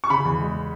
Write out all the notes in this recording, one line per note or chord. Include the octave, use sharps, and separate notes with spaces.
C#6
C#3 B5
E2
G#3